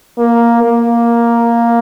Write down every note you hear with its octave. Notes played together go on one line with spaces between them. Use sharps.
A#3
A#3